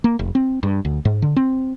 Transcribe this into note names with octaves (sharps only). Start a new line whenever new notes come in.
A#3
F1
C4
G2
D2
G#2
D3
C4